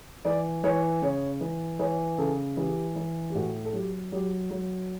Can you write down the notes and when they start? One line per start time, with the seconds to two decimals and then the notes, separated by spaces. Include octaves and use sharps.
0.25 E3 D5
0.64 E3 C#5
1.02 C#3 C#5
1.41 E3
1.79 E3 C#5
2.18 C#3 A4
2.57 E3 G4
2.96 E3
3.30 G4
3.35 A2 F#4
3.65 A4
3.73 F#3 G4
4.12 F#3 G4
4.50 F#3